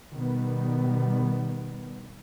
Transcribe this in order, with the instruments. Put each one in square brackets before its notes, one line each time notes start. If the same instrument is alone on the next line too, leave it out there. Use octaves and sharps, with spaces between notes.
[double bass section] B2 D#3 G3 B3